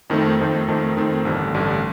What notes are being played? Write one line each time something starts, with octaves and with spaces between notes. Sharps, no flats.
F2 D#3 A3 C4
F2 D#3 A3 C4
F2 D#3 A3 C4
F2 D#3 A3 C4
A1 G2 D3
A1 G2 D3